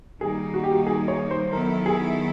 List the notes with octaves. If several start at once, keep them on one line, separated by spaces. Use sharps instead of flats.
D#3 G3 A#3 D#4 G#4
F#4
G4
F#4
G#4
C#5
C5
D#3 F#3 B3 E4 A4 A#4
G#4